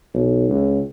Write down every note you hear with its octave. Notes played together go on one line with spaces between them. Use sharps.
B1
C#2